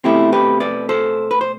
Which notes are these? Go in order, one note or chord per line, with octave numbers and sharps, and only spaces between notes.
B2 A3 C4 E4 G4
G4 B4
B4 D5
A4 C5
B4
C5